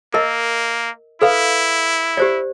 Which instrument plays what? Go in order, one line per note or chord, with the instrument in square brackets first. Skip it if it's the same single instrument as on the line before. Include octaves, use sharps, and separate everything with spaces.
[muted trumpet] A#3 [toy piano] A#4 D#5
[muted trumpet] E4 [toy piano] A4 B4 F5
[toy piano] G4 C5 D5